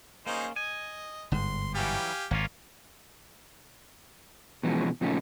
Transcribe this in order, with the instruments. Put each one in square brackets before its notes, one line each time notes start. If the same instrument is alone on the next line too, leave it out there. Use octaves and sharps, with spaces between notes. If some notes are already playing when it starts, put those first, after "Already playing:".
[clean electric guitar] A#3 C#4 [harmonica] D#4 G#4 C5
[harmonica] D#5 [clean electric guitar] G#5
[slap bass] G1 G#2 [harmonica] C6
[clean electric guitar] E3 F#3 G3 [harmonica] G4 F5 G#5
[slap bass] G#1 [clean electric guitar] A#3 C#4 F4
[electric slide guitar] B2 E3 F3 G#3 C#4
A#2 C#3 F3 A3 C#4 D#4